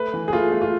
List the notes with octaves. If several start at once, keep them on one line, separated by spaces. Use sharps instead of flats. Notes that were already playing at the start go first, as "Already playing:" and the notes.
Already playing: A3 B4
E3
G#4
A3 F4
A3
F4